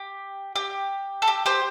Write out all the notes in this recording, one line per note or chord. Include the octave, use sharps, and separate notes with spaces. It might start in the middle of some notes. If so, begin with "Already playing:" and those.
Already playing: G4
G4
A4
G4
G4 C5